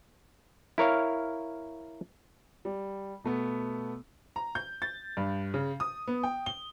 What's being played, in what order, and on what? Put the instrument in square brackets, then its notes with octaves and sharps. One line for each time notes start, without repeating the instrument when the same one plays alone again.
[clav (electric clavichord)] E4 A#4 C#5 F5
[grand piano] G3
B2 A3 B3
[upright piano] A#5
G6
A6
G2
C#3
D#6
B3
G5
G7